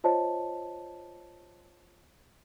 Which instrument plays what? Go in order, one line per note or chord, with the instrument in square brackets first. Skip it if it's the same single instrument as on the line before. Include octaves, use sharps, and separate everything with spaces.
[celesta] F4 C5 C#5 D#5 A5